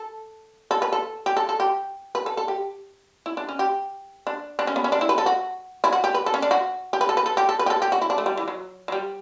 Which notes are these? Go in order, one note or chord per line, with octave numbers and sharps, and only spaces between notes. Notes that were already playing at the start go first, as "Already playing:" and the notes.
Already playing: A4
A4
B4
A4
G4
A4
A4
G4
B4
A4
A4
G4
E4
D4
C#4
G4
D4
D4
C#4
B3
C#4
D4
E4
B4
A4
F#4
E4
F#4
G4
B4
A4
C#4
D4
F#4
G4
B4
A4
B4
A4
G4
A4
B4
G4
A4
G4
F#4
E4
D4
A3
G3
E3
F#3
F#3
G3